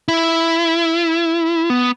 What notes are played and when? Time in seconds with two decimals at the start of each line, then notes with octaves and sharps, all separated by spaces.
0.08 E4
1.70 B3